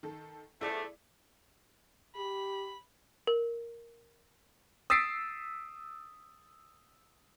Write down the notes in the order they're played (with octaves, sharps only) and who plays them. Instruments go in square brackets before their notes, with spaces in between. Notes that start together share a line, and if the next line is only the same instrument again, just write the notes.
[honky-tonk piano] D#3 A4
[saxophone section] E2 F3 A3 [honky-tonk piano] E4 G#4 D5
[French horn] G4 [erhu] B5
[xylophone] A#4
[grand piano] D#6 E6 A6 B6 C7 D7